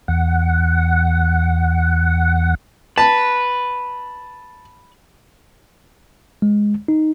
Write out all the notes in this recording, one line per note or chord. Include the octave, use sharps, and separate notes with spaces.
E2 F#5
B4 A5
G#3
D#4